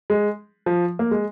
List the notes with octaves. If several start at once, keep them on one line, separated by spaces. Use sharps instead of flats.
G#3
F3
A#3
G#3